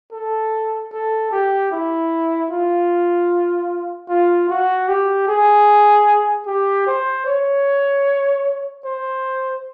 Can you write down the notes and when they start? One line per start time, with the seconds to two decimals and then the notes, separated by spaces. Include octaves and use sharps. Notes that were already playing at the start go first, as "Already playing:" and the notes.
0.12 A4
0.92 A4
1.31 G4
1.71 E4
2.50 F4
4.09 F4
4.49 F#4
4.88 G4
5.27 G#4
6.46 G4
6.86 C5
7.26 C#5
8.84 C5